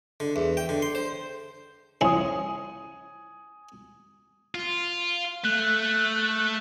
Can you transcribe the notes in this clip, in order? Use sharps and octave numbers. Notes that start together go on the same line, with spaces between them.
D3
E2
G5
D3
C6
C5
C#3 F3 E4 G#5 D#6
F4
A3 F#6